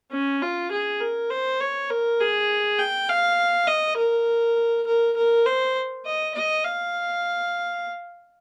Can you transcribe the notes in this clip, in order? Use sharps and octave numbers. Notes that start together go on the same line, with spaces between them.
C#4
F4
G#4
A#4
C5
C#5
A#4
G#4
G5
F5
D#5
A#4
A#4
A#4
C5
D#5
D#5
F5